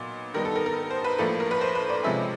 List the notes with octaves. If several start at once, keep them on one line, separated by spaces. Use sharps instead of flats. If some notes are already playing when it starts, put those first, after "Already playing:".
Already playing: A#2 F#3 B3 D#4
D#3 G3 B3 D#4 A#4
A4
A#4
A#4
C5
B4
A2 F3 A#3 D4 A4
A#4
B4
C5
B4
D5
C3 F3 G#3 C#4 E5